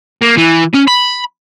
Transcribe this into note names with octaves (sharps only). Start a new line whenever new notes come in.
A#3
E3
C#4
B5